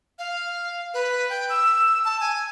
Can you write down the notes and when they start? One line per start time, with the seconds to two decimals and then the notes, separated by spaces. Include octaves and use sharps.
0.19 F5
0.94 B4
1.29 G5
1.49 E6
2.05 A5
2.20 G#5